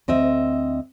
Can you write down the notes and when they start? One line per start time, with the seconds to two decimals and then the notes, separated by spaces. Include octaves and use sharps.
0.08 D2 C4 D#5 E5